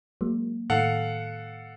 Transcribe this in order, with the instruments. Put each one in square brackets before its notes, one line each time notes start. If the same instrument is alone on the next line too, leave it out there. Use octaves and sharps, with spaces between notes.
[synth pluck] F#3 G#3 A#3
[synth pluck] A2 D#3 [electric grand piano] A4 F5 F#5